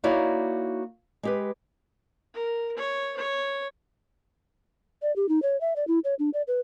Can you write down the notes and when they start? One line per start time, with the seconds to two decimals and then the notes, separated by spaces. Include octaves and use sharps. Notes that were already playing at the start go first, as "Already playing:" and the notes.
0.04 A#3 D#4 E4 F#4 C#5 D5
1.23 G#3 G4 B4
2.34 A#4
2.76 C#5
3.16 C#5
5.02 D5
5.16 G4
5.29 D#4
5.42 C#5
5.61 E5
5.76 D5
5.88 E4
6.04 C#5
6.19 D4
6.34 D5
6.48 B4